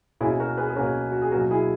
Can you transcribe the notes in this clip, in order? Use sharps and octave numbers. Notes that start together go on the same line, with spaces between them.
B2 A#3 C#4 E4 G#4
F#4 A#4
G#4 B4
G#4
B2 A#3 C#4 F#4 A#4
F#4
G#4
B2 F#3 A#3 F#4 A#4
E4 G#4